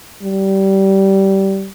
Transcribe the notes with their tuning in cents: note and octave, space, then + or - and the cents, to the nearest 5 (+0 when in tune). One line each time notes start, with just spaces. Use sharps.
G3 -20